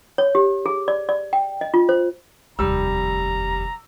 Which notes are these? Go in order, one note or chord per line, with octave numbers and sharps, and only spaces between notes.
C#5
G4
G#4
D5
D5
G5
D#5
F4
C5
F1 D#2 G3 A#5 E6